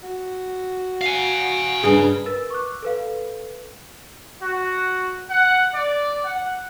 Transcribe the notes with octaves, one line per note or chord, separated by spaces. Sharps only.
F#4
F5 G#5
G2 C#3 G#4
A#4 B4 E6 A6
C#6 D6 F#6
A4 B4 F5
F#4
F#5
D5
F#5